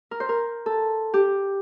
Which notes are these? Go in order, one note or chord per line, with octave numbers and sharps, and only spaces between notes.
A#4
C5
A#4
A4
G4